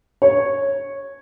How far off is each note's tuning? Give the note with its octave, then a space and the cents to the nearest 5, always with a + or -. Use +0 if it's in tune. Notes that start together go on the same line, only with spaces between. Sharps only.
C#5 -10